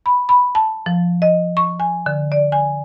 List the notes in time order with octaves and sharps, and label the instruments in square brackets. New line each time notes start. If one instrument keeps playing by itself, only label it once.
[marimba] B5
B5
A5
F3
D#5
C#6
G#5
D3
D5
G#5